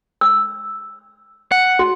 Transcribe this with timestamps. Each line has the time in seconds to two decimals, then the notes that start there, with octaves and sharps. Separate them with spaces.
0.21 E6
1.52 F#5
1.79 F#4